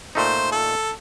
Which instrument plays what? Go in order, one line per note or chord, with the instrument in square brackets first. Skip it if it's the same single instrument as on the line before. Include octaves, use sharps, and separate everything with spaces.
[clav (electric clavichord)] A#2 A3 D#4 [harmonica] C5
[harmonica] A4